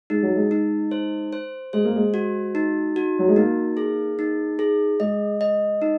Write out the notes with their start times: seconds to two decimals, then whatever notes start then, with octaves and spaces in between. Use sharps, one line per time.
0.10 G#3 D#4
0.23 F#3
0.36 G#3
0.51 D#4
0.91 C5
1.32 C5
1.73 G#3 C5
1.85 A#3
1.96 G#3
2.14 F#4
2.55 D#4
2.96 F#4
3.19 F#3
3.28 G#3
3.36 A#3 D#4
3.77 G#4
4.19 D#4
4.59 G#4
5.00 G#3 D#5
5.41 D#5
5.82 D#4